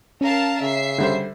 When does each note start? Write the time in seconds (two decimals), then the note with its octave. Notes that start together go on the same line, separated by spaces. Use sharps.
0.21 C#4 A#4 F5 A5
0.61 C#3 E5 C7
0.98 D3 G3 C5